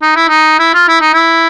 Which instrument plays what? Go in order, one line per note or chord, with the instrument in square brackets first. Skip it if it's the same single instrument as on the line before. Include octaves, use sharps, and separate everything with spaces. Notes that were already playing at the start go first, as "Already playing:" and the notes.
[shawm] D#4
E4
D#4
E4
F4
E4
D#4
E4